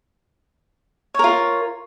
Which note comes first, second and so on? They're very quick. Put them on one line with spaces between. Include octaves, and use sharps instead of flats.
C#5 A#4 F4